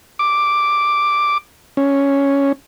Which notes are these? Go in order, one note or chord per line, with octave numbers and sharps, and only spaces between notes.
D6
C#4